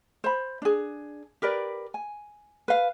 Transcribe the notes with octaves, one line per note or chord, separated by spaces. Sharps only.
C5 B5
D4 G#4
G4 A#4 B4 D5
G#5
B4 F5